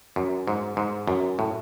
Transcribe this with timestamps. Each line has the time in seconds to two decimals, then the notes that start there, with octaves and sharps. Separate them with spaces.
0.16 F#2
0.48 G#2
0.77 G#2
1.08 F#2
1.39 A2